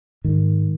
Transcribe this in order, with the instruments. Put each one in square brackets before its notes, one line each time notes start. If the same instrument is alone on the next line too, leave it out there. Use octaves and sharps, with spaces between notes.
[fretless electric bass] G#2 D#3